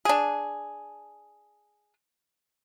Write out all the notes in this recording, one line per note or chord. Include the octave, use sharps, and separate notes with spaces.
D4 G#4